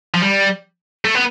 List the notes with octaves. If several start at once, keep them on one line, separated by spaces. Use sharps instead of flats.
F3
G3
A3
B3